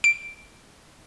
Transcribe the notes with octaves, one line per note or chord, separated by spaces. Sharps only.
D7